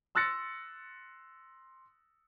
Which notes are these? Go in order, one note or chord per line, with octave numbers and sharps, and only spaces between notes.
C6 E6 F#6 A6 A#6 C#7